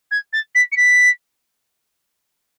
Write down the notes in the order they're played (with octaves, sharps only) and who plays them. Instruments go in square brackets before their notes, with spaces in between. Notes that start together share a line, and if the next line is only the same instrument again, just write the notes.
[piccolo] G#6
A6
B6
C#7
B6